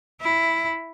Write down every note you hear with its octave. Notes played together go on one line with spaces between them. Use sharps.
E4